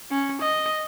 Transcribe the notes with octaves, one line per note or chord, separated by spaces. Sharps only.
C#4
D#5